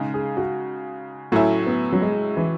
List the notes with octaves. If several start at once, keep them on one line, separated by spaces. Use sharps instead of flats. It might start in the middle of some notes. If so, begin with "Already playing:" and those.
Already playing: C#3 G#3 D#4
G#4
F#4
A2 F#3 A3 C#4 E4
B3
F#3
G#3
E3